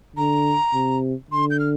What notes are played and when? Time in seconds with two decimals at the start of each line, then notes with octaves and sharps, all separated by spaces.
0.16 D3 A#5
0.74 C3
1.31 D3 C6
1.50 G6
1.60 F6